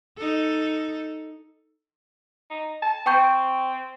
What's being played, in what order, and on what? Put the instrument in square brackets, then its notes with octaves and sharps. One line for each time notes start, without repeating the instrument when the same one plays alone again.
[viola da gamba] D#4 A4
[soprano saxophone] D#4
A5
[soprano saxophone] C4 [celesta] G5 C#6 G6